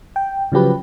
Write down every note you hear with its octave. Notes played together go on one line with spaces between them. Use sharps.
G5
C#3 F3 F#3 G4 B4